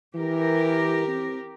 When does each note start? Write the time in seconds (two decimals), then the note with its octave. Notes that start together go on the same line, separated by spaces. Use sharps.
0.14 E3 G4 A#4
1.08 C4